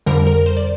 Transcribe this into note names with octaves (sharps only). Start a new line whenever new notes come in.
F2 D3 G3 A#4
A#4
C5
D5